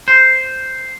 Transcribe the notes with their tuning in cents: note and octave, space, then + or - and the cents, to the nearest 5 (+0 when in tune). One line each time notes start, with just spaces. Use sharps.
C5 -5